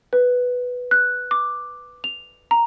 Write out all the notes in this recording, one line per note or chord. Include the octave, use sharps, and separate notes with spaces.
B4
F#6
D6
F7
A#5